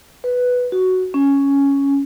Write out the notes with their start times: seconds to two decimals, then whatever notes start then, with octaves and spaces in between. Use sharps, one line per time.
0.24 B4
0.72 F#4
1.14 C#4